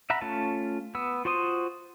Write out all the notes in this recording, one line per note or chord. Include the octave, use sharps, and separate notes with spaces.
E5 F#5 A#5 B5
A3 C#4 F4 A5
B3 E6
F4 F#4 C5 C6 D#6